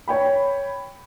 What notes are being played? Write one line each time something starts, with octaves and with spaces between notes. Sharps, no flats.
C#5 G5 B5